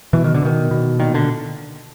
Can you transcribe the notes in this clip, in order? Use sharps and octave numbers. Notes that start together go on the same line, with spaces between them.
B2 E3
D#3
D3
B2 D#3
B2
A#2 D#3
D3